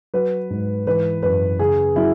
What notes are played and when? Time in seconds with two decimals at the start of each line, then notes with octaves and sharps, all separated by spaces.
0.14 F#3 B4
0.50 G#2
0.87 E3 B4
1.23 F#2 B4
1.59 C#3 G#4
1.96 F#3 E4